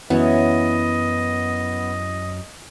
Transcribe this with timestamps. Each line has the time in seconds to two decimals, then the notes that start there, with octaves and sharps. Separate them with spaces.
0.10 F#2 E3 F#3 B3 C#4 D#5